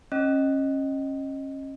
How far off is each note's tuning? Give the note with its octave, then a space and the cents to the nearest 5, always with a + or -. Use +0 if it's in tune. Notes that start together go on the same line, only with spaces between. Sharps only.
C#4 -30 D#5 +0